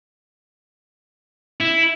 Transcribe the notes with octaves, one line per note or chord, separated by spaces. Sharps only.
E4